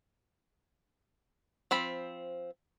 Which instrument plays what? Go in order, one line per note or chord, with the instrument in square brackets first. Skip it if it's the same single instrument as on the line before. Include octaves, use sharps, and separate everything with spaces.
[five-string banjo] F3 C4 B5